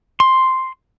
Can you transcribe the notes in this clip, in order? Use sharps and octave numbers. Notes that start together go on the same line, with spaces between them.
C6